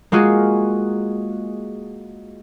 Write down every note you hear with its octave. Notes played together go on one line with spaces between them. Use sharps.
G#3 A#3 F4 F#4 G#4